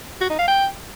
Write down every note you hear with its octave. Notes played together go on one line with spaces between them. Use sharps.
F#4
D#4
F5
G5